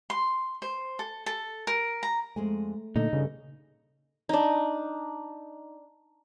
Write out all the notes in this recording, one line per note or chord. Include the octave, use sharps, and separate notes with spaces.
C6
C5
A4
A4
A#4
A#5
F2 G#3 A3 G#5
A#2 D3 A3 D#4 A4
G2 C#3
D4 D#4